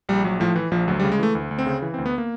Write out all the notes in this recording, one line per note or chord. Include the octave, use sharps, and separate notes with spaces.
A#1 G3
A#1 F#3
A2 F3
E3
A#1 F3
D2 F#3
G3
C#3
G#3
E3 A3
D2
D2
C4
C#3
E3
C4
D2
B3
A#3